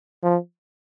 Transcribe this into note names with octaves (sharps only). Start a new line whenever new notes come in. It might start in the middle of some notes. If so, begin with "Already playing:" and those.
F3